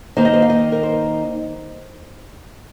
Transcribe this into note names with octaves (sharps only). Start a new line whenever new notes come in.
D#3 A#3 D#4 C5
D#5
C5
F5
D#5
A#4
C5